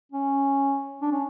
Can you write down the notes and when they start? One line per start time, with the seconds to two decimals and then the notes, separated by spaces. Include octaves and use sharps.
0.12 C#4
1.02 D4
1.12 C#4